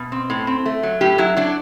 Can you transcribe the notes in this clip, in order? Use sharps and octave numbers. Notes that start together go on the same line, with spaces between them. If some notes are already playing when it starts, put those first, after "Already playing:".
Already playing: B2
C4
A2
C4
A3
F#3
A2 G4
F#3 E4
F#3 D4